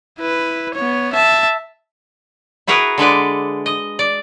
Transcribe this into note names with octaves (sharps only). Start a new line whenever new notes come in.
E4 B4
B3 C#5
E5 A5
E4 F#4 G#4 A#4 B4
D3 G#3 B4 D5
D#5
D5